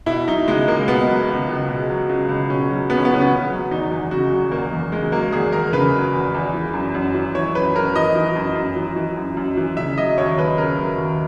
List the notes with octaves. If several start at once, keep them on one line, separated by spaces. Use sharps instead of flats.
B2 E4
F#3 D#4
C#2 G#3
C#2 A#3
B2 B3
F#3
C#2
C#2
B2
F#3
C#2
C#2
B2 C#4
F#3
C#2 B3
C#4
B3
C#2 C#4
B3
C#3
F#3
E2 D#4
E2
C#3 F#4
F#3
E2 A#3
E2
C#3 G#3
F#3 A#3
E2 G#4
E2 A#4
C#3 B4
F#3
E2
E2
E3
F#2
F#2
E3
E3 C#5
F#2 B4
F#2 A#4
E3 D#5
E3
F#2
F#2
E3
E3
F#2
F#2
E3
C#3 E5
F#3 D#5
D#2 C#5
D#2 B4
C#3 A#4
F#3
D#2